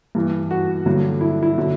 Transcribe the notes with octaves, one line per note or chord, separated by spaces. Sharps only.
G2 E3
F#4
G2 D3 F#3
E4
E4
D3 F#3